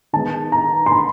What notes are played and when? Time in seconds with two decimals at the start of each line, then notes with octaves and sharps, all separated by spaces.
0.13 D#3 G#3 B3 A5
0.52 A#5
0.86 C6
0.92 B5